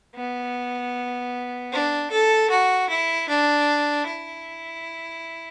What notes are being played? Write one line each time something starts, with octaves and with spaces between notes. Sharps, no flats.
B3
D4
A4
F#4
E4
D4
E4